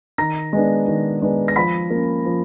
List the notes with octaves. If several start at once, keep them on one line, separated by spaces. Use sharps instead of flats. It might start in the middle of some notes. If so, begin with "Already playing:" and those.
D#3 A#5 A#6
G#3 B3 D4
D#3
G#3 B3 D4
A#6
F3 B5 B6
A#3 C#4
F3